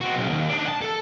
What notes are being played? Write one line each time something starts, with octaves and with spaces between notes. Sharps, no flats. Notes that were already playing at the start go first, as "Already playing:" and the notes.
C4 F#4
B1 C#3
D#2
D4 D#4
F#5 A5
A4